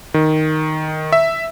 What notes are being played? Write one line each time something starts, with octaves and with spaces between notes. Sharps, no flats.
D#3
E5